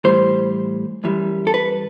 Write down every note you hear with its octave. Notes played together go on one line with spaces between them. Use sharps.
A2 E3 G3 C5
F#2 E3 G3
A4
B4